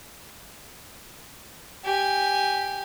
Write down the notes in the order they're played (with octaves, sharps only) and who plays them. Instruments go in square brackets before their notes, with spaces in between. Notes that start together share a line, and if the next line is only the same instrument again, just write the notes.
[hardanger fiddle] G4 G#5